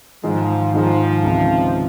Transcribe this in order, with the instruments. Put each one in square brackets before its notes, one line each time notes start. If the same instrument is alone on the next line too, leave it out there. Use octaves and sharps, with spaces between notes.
[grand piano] G#2 D#3 G#3 [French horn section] F3
[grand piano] G#2 D#3 G#3 [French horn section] F3
[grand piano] C#2 C3 D#3